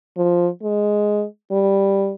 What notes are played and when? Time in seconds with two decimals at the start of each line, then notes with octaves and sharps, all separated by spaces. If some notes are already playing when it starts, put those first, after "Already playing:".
0.17 F3
0.62 G#3
1.51 G3